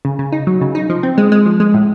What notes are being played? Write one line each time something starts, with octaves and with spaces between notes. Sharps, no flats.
C#3
C#3
D#4
F#3
C#3
D#4
F3
C4
G#3
G#3
F3
G#3
A2